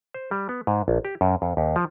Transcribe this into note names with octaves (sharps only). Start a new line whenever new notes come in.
C5
G3
B3
G#2
A#1
G4
F#2
F2
D#2
F3